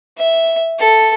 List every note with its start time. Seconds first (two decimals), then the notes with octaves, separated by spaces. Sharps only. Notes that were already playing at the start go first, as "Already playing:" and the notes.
0.18 E5
0.79 A4